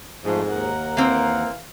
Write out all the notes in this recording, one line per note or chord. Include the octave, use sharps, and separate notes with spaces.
F2 G#2 F3 A3 C5
D#2 A#4 F#5
E3 A#3 C4 F5